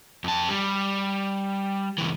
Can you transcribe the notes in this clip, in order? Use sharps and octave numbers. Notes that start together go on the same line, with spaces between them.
F2 A5
G3
C#2 E3